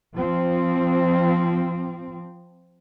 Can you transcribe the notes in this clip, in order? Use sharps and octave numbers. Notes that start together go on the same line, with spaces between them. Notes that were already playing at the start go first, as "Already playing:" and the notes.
F3 C4